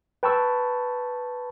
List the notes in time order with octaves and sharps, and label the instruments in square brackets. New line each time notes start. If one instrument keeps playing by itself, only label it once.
[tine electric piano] B4 G5 A5 B5 C#6 E6